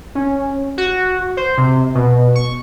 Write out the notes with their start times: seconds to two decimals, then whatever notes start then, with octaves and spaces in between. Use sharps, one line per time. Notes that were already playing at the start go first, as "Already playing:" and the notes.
0.15 C#4
0.78 F#4
1.37 C5
1.57 C3
1.95 B2
2.35 C#6